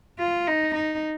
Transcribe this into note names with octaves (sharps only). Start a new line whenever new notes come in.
F4
D#4
D#4